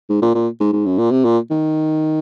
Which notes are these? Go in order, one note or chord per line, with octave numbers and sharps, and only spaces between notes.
G#2
A#2
A#2
G#2
G#2
F#2
A#2
C3
A#2
D#3